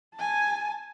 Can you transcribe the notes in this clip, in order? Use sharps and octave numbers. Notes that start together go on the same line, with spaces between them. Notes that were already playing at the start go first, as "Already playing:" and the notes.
G#5 A5